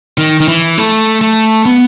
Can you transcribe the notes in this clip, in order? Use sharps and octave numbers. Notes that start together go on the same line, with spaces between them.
D#3
D#3
E3
A3
A3
B3